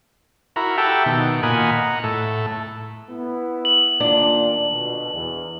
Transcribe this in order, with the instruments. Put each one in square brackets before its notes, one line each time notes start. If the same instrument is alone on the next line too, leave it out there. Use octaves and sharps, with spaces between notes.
[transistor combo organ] E4 F#4 A#4 A#5 B5
G4 A4 E5 F#5 G5 A5
B2 D#3
A#2 A#4 D#5 F#5 G#5 B5
F#5 A#5
A2 A4
[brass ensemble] B3 E4
[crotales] F#7
[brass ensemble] A#2 D#3 [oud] D4
[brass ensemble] B2 D3
E2